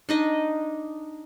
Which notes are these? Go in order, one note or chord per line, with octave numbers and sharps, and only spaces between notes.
D4 D#4 D#5